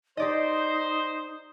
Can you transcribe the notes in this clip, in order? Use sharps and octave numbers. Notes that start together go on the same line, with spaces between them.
D#4 G4 C5 D5 D#5